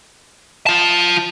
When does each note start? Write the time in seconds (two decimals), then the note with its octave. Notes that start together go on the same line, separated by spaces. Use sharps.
0.67 F4 A5